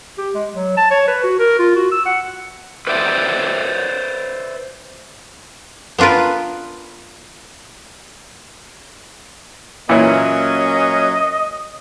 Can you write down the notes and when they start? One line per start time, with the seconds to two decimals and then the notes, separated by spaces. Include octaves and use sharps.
0.18 G4
0.34 G#3
0.52 F#3
0.77 A5
0.91 C#5
1.08 B4
1.24 F#4
1.39 A#4
1.59 F4
1.76 F#4
1.92 E6
2.06 F#5
2.87 B4 C5 D5 E5
5.98 B3 D4 F4 A#4 B4
9.89 A#2 E3 F#3 A#3 C#4 E4 D#5